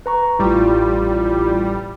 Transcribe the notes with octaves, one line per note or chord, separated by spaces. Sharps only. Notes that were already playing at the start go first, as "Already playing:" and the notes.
B4 A#5 C#6
A1 G3 E4 F4